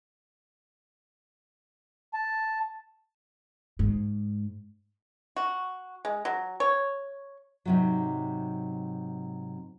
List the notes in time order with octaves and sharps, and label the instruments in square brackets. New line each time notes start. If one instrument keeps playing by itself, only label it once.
[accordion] A5
[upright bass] G#2
[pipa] F#4
G#3
F#3
C#5
[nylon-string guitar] G#2 C3 F#3